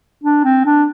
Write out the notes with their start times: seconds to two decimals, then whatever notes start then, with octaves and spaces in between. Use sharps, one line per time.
0.24 D4
0.44 C4
0.65 D4